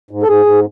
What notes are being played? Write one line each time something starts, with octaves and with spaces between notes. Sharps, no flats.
G#2
A4
G#2 G#4
G#2